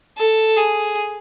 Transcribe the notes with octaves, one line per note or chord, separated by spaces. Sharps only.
A4
G#4